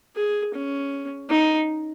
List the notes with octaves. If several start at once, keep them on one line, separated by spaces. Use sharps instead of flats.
G#4
C#4
D#4